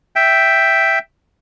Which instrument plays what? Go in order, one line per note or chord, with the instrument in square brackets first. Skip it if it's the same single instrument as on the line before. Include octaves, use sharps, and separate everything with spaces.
[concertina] E5 G5